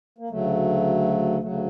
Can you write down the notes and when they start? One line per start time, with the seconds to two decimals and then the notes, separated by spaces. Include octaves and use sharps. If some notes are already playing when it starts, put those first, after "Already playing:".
0.18 A#3
0.29 D2 C#3 F#3 A3
1.41 D2 C#3 F#3 A3
1.51 A3